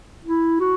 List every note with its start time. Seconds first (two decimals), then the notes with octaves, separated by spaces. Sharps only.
0.25 E4
0.60 F#4